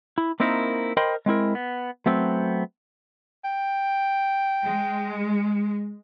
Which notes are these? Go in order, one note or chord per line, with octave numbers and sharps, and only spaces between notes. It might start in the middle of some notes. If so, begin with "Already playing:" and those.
E4
A#3 C4 D#4 E4 A#4
A#4 C5 D#5 G5 B5 C6
G#3 C4 E4 A#4
B3
F#3 A3 B3 C4
G5
G#3